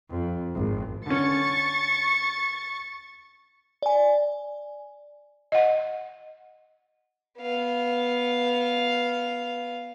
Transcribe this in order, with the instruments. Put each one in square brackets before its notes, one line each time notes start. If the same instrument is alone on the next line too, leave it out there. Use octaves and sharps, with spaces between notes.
[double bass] F2
G#1
[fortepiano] D3 C#4 [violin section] C#6 A6 C#7
[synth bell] D5 G#5
[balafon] D#5 F#5
[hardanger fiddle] B3 F5